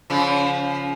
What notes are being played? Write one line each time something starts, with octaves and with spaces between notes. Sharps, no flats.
C#3 F3